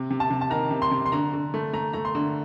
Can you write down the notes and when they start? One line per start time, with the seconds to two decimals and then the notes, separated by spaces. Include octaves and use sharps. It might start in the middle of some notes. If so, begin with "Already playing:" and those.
Already playing: C3
0.10 C3
0.20 A5
0.31 C3
0.41 A5
0.50 D#3 A#5
0.71 C3
0.82 C6
0.91 C3
1.06 C6
1.12 D3 A#5
1.33 D3
1.54 A3
1.73 A3 A#5
1.93 A3 A#5
2.05 C6
2.15 D3